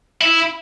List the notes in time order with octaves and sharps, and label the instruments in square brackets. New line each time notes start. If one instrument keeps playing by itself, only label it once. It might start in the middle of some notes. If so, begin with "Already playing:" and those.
[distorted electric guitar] E4